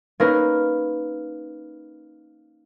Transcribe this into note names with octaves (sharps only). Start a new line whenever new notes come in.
A#3 C#4 D#4 A#4 B4